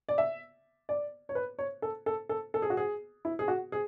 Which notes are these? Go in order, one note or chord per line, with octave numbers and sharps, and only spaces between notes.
D5
E5
D5
C#5
B4
C#5
A4
A4
A4
A4
G#4
F#4
G#4
E4
G#4
F#4
G#4